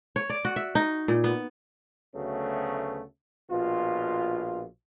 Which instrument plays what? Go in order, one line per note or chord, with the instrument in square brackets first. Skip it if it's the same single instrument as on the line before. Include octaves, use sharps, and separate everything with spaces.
[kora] C#5
D5
F#4
E5
D#4
A#2
B3
[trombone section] D2 C#3 F#3 A3 B3
A#1 B2 F4